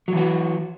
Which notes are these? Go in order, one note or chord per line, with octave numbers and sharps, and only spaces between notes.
E3 F#3 F#4